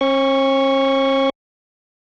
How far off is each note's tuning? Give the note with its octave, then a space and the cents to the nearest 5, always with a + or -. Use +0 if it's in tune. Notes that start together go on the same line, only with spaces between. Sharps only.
C#4 -45 C#6 +0